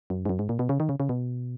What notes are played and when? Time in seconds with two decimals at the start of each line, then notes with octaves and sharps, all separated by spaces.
0.10 F#2
0.25 G#2
0.29 F#2
0.39 G#2
0.49 A#2
0.59 B2
0.69 C#3
0.80 D#3
0.89 C#3
1.00 C#3
1.09 B2